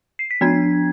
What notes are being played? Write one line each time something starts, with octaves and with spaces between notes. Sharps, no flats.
C7
B6
F3 B3 D4 G#6